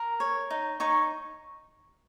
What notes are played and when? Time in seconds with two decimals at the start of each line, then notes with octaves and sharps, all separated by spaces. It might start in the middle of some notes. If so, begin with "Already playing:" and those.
Already playing: A#4
0.20 C#5
0.50 D#4
0.80 D#4 C#5 C#6